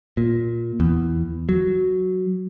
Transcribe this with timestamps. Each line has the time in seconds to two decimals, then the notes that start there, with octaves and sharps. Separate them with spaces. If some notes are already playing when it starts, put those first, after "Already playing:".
0.17 A#2
0.80 E2
1.49 F#3